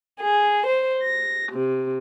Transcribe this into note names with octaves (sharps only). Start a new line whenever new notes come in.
G#4
C5
A#6
C3